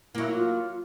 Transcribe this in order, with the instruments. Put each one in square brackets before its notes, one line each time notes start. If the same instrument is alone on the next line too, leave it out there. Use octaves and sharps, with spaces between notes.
[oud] F#3 A#3 [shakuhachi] E4
[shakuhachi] F4